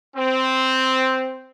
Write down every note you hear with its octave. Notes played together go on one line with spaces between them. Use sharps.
C4